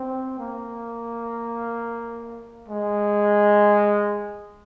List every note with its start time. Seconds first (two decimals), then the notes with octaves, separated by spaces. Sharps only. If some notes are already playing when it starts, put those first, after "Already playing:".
Already playing: C4
0.39 A#3
2.68 G#3